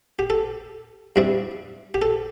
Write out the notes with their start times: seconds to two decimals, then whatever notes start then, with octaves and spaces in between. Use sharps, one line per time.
0.19 G4
0.30 A4
1.16 G2 G3 C4 E4
1.94 G4
2.02 A4